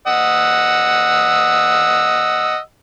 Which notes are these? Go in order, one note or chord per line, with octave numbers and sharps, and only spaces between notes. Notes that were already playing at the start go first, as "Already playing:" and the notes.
D#5 F#5 E6